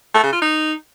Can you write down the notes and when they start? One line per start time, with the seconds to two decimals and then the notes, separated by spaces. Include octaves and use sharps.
0.14 A3
0.23 C#3
0.32 F4
0.41 D#4